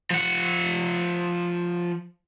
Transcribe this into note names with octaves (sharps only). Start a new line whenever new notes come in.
F3 F#5